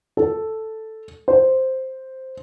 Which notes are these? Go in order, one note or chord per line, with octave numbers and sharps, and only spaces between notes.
A4
C5